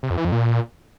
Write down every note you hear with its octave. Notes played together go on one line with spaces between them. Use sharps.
C3
F2
E3
F2
A#2